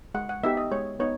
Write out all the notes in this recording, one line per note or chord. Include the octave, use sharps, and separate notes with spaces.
G#3 F#5
F#5
B3 D#4 G4 E5
D#5
G#3 C#5
B3 D#4 C#5